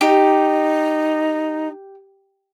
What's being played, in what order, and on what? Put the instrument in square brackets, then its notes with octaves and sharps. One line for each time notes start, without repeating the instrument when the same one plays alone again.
[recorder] D#4 [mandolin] G4